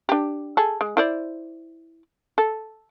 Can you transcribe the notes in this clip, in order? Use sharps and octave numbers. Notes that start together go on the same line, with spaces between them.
D4 G4
G#4 A4
G#3
E4 C5 D5
A4